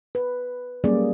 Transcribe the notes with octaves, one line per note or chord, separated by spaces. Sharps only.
B4
F#3 G3 A#3 C#4 G#4 D5